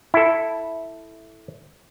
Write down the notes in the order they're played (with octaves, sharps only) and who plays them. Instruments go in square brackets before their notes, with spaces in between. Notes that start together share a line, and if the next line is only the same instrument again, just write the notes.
[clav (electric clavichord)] E4 A4